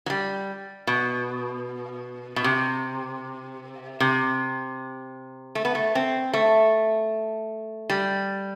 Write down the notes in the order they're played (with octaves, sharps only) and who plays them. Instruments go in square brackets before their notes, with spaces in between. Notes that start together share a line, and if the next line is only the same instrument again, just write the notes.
[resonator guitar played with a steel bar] F#3
G3
B2
B2
C3
C3
A3
B3
A3
C4
A3
G3